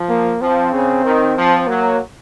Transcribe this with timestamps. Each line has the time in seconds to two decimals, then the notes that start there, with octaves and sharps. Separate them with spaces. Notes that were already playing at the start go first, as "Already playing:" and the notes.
Already playing: F3
0.09 A#3
0.41 F3 C4
0.72 C#3
1.04 D#3
1.35 F3
1.67 F#3 A#3